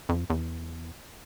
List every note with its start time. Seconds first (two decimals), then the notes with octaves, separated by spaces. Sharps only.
0.09 F2
0.30 E2